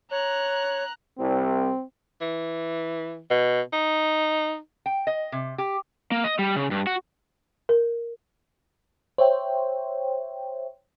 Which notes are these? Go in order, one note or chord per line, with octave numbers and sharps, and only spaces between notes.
C#5 A#5 F#6
C2 C4
E3
B2
D#4
G5
D#5
C3
G4
A#3
D#5
G3
C#3
G2
F#4
A#4
C5 C#5 E5 G5